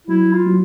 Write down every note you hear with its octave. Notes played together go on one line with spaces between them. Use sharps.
F#3 E4
F4
F#3